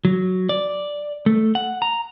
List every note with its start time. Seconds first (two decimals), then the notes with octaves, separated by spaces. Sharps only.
0.05 F#3
0.49 D5
1.26 A3
1.55 F#5
1.82 A#5